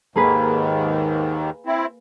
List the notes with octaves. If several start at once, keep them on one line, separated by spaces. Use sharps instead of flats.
D#2 G#2 D#3 A#3 G#4 B4
C4 E4